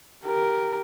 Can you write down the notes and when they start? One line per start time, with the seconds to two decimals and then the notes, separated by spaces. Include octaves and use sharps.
0.24 G4 A#4